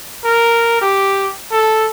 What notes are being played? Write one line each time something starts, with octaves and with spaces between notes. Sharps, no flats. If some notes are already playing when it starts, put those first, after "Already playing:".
A#4
G4
A4